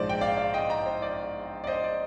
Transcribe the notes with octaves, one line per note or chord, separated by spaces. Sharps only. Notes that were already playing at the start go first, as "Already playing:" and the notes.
Already playing: A#1 G#2 F3 G#3 C5 D5
G5
D5 F5
D5 F5
D#5 G5
G5 A#5
C5
D5
D5
C5 D#5
D5